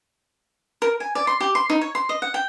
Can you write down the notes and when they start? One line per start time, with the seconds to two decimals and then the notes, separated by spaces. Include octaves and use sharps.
0.82 A#4
1.00 G#5
1.15 D5
1.27 C6
1.40 G4
1.55 C6
1.70 D#4
1.81 C#5
1.95 C6
2.09 D#5
2.22 F#5
2.34 G5